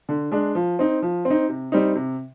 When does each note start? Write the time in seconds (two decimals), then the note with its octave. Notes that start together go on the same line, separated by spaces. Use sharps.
0.09 D3
0.32 G#3 D4
0.55 F3
0.79 C4 D#4
1.02 F3
1.25 C4
1.31 D#4
1.49 C3
1.72 G3 C4 D#4
1.96 C3